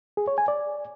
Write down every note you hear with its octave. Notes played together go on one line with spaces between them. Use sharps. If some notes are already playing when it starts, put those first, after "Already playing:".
G#4
C#5
G#5
D5